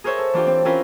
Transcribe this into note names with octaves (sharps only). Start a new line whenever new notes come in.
G#4 A#4 C5 C#5 E5
A4
E3 D4 F4 G4
C4
C4 C#4 E4 F4 A#4 B4